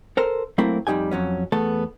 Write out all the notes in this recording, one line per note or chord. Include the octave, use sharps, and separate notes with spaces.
A4 A#4 C5
F#3 A3 A#3 C4 E4
F2 G3 D#4 G4 G#5
F2 F#3 C#4
E2 A3 B3 A4 A5